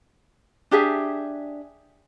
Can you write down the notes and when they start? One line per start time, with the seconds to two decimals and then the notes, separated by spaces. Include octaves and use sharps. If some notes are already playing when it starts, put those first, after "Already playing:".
0.71 D4 G4 G#4 E5